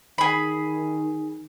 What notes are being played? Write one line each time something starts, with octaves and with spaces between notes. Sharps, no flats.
D#3 G#4 B5